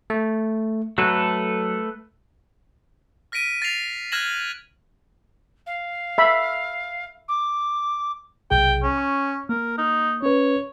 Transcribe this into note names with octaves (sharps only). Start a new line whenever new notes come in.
A3
F#3 A3 A4 B4
F6 A#6 B6 D7 D#7
A6 A#6 C7 F7
F6 F#6 G#6 A#6 E7 F#7
F5
E5 B5
D6
B1 C3 G#4 G5
C#4
C#6
A#3 A#4
D#4
C#4 B4 C#5